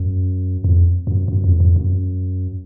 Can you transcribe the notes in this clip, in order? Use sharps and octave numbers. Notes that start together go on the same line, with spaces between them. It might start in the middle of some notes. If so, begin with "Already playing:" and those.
Already playing: F#2
F2
F#2
F#2
F2
F2
F#2